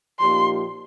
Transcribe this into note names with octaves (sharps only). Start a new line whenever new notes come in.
A#2 F3 A#3 D#4 G4 C6